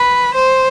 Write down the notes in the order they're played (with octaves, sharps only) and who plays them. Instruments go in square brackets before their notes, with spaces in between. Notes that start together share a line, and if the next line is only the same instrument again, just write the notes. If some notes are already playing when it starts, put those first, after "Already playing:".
Already playing: [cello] B4
C5